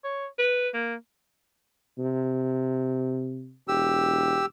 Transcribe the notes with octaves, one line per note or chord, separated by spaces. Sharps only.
C#5
B4
A#3
C3
E1 G4 E6